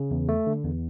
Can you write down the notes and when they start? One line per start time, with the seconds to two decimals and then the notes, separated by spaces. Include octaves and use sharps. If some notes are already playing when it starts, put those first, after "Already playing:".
Already playing: C#3
0.11 E2
0.29 A3
0.47 D3
0.64 E2